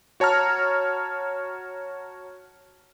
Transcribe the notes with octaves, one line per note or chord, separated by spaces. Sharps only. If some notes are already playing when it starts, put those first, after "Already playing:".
F#4 C#5 A5 A#5 F6